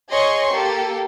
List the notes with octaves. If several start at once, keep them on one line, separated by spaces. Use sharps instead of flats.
G#4 C#5 D#5 C6 C#6
A#3 G4 A4